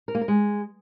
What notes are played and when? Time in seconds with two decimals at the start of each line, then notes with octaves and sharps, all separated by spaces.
0.08 A#4
0.15 A#3
0.21 A#4
0.28 G#3